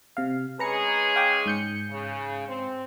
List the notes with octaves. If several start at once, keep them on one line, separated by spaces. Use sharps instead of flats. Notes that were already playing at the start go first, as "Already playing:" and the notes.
C3 F5
G#3 C#4 G#4 B4 A#5 C#7
F5 G5 D6
G#2 G6 C#7
C#3
C4